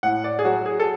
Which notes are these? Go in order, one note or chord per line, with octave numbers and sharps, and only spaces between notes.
A2 F#5
D5
G#4
F#3 F#4
G#4
A4